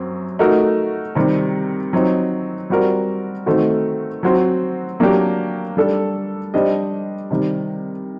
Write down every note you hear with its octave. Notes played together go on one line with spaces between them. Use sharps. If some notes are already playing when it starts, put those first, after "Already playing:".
Already playing: F#2 F#3 C4
A3 D#4 F#4 A#4
C3 D#3 G3 C4
F#3 C4 D#4
G3 C4 F#4 A#4 D5
D#3 A3 C4 D#4 F#4
F#3 C4 F#4 C5
F#3 A#3 D4 G4 A#4
G3 D4 A4
G3 D4 G4 C5 D#5
C3 D#3 G3